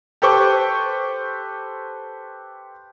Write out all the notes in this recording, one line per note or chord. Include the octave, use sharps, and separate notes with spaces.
G4 A4 B4 C5 C#6 D6